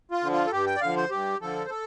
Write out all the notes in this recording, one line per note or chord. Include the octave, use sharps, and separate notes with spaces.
F4
D3 F3
F4
A4
G2 G4
G5
D5
D3 F3 F5
C5
G2 G4
D3 F3 A4
C5
A4